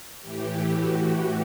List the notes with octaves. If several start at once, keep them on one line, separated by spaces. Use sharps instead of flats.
A2 E3 G4
F#4